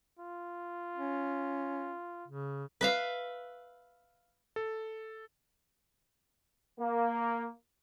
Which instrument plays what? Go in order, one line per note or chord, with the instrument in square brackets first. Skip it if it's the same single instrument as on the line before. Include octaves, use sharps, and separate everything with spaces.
[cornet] F4
[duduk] C#4
C#3
[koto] B4 E5 F5
[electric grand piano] A4
[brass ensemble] A#3